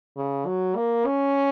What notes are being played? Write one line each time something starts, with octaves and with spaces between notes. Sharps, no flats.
C#3
F#3
A#3
C#4